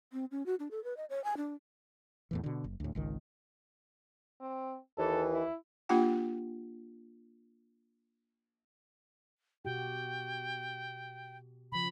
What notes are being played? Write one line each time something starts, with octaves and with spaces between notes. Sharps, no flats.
C4
C#4
F#4
D4
A4
B4
D#5
C#5
G#5
D4
E2 A2 E3
B2 D3
F#1
D2 A2
G#1 C#2 D#3
C4
D#2 E3 A4
E4
A#3 D4 F4 G4 F#5 G5
B2 F#4 G4 G5
C#3 F3 B5